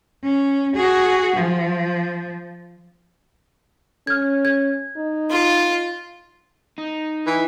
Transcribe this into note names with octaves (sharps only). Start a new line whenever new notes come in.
C#4
F#4 G#4
F3
C#4 F6 G#6
G#6
D#4
F4
D#4
E3